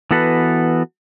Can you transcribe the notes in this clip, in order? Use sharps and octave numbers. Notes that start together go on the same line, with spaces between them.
E3 B3 F#4 A4 B4